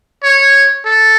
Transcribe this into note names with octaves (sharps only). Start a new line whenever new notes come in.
C#5
A4